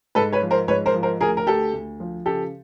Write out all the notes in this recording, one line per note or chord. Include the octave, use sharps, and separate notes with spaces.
G#2 A4 B4
B4 C#5
F3
A#4 C5
G#2 B4 C#5
A#4 C5
F3
A#4 C5
D2 G#4 A#4
A#4
D2 G4 A4
D2
F3
C#3 G4 A4